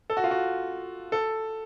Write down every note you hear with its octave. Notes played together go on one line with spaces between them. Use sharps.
A4
F#4
F4
F#4
A4